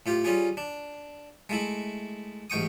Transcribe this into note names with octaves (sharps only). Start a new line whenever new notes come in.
A2 F4 G4
G3 C#4 F4 G#4
D4
G#3 A3 E4
A1 G#2 G5 C#6 D#6